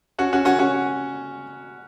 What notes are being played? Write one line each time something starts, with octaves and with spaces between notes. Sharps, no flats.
C#4 F#4
C#4 F#4
C#4 F#4
C#4 F#4